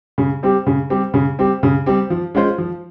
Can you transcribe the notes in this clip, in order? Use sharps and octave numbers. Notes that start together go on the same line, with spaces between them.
C#3
G3 C4 G4
C#3
G3 C4 G4
C#3
G3 C4 G4
C#3
G3 C4 G4
F3
G#3 C#4 F4 C5
F3